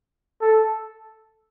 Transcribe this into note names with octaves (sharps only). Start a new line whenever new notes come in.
A4